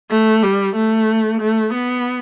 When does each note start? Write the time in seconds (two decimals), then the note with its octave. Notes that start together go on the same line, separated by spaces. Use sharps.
0.10 A3
0.43 G3
0.76 A3
1.41 A3
1.74 B3